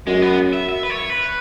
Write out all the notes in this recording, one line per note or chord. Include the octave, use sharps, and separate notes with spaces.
F#2 G#3
B3
E5
E5
B4
C#5
B4